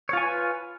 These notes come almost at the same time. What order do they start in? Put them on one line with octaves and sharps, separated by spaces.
C#5 F4 G#5 B4